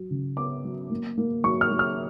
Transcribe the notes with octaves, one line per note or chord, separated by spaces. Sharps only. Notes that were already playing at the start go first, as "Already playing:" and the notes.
Already playing: F#3
C#3
B3 D6
F#3
A#3
A#3
F#3 C#6
F6
F#3
F6